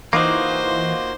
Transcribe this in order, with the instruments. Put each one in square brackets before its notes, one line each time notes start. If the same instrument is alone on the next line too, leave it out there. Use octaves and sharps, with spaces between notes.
[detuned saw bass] E3 [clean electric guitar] A#3 F4 F#4 [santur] D#4 D6 [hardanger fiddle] C5